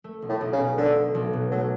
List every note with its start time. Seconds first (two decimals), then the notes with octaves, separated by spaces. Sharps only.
0.04 A3
0.22 B1
0.29 A2
0.41 B1
0.53 C#3
0.59 B2
0.78 D3 A3
0.96 B1
1.15 B1
1.33 B2
1.51 F#3 A3